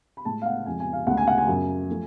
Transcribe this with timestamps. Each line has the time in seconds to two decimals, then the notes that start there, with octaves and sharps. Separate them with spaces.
0.17 B5
0.25 A2 G#3 A5
0.42 F5
0.46 F#5
0.66 F2 F3 G#3 G#5
0.80 G#5
0.93 F5
1.07 D2 C#3 G#3 F#5
1.17 G#5
1.27 F#5
1.38 G#5
1.48 F#2 C#3 F#3
1.89 F3 A3